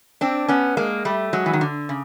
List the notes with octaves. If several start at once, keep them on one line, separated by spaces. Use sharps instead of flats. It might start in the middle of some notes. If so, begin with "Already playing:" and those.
C4 D4
B3 C#4
G#3 A#3
G3 A3
F#3 G#3
E3
D#3
D3
C#3